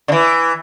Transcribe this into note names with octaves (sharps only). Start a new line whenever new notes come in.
D3
E3